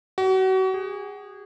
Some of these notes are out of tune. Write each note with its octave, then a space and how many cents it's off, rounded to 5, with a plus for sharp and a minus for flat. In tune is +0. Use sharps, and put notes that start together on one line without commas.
F#4 +35
G#4 -25